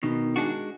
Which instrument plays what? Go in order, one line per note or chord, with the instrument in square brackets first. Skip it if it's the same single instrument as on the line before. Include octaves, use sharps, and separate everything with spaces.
[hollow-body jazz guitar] B2 [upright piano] D#3
[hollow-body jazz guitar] G#3 D4 F#4